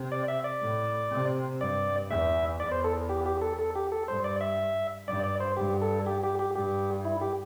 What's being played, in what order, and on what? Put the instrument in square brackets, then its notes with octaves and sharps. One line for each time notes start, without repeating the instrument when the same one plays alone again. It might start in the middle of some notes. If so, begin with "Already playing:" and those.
Already playing: [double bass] C3
[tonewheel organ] D5
E5
D5
[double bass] A2
C3
[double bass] G2 [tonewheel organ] D5
[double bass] E2 [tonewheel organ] E5
[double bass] E2 [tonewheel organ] D5
[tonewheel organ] C5
A4
G4
G4
A4
A4
G4
A4
[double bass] G2 [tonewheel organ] C5
[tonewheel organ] D5
E5
[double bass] G2 [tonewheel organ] D5
[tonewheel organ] D5
C5
[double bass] G2 [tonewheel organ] G4
[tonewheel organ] A4
G4
G4
G4
[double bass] G2 [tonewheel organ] G4
[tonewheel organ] E4
G4